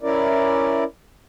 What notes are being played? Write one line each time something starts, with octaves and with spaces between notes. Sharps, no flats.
C#4 E4 A#4 D5